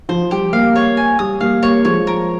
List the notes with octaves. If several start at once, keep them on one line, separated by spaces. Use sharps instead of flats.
F3 C5
G3 G4
G3 A#3 F5
C#5
G#5
G3 D#6
G3 A#3 F5
G3 A#3 C#5
F3 G#3 C#5
A#4